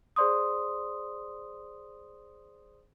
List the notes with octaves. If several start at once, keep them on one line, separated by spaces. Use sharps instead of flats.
G#4 C5 D5 C6 D#6